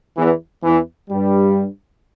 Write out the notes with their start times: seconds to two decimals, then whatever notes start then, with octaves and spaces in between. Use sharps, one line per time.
0.17 E2 E3
0.63 E2 E3
1.10 G2 G3